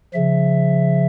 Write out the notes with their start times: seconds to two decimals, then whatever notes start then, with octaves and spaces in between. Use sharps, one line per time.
0.14 C#3 F3 E5